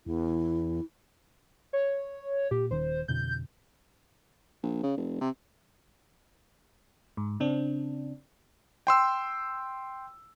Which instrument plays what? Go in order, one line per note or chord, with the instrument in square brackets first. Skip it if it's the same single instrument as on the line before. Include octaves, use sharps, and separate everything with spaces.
[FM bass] E2 [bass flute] E4
[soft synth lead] C#5
[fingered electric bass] A#2 [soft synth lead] G4
[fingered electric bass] D#1 D#3 [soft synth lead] C5
[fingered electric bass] F2 B2 D3 [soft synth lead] G6
[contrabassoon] A#1
C#3
F1
C3
[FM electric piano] G#2
C#3 C4 D4
[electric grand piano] G5 C6 E6